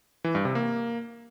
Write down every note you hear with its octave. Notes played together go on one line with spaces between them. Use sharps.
E3
G2
C3
A#3